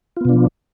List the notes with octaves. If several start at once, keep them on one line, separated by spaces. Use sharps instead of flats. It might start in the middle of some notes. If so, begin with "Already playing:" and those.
B2 F3 B3 D4 F4